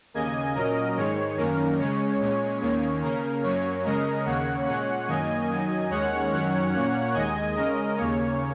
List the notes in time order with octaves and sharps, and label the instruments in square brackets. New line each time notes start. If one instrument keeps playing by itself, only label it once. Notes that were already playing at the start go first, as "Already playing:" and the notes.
[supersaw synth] D#2 C#3 A#3 D#5 G#5
A#2 F#3 C#4 A#4 D#5
G#2 D#3 G#3 C#5
F#2 D#3 A#3 C#4 A#4
C#3 G#3 C#4 C#5
A#2 G#3 C#4
D#2 D#3 A#3 C#4 C#5
C#3 A#3 C#4 A#4
F#2 F#3 A#3 C#4 C#5
C#3 G#3 C#4 A#4 D#5
D#2 C#3 A#3 C#5 F#5
A#2 G#3 C#4 C#5 F#5
F#2 D#3 A#3 C#4 D#5 G#5
F#2 D#3 F#3
D#2 D#3 G#3 C#4 C#5 F#5
F#2 D#3 F#3 C#4
A#2 A#3 C#4
D#2 D#3 G#3 D#5 G#5
C#3 G#3 C#4 A#4 D#5
D#2 C#3 A#3 C#4 C#5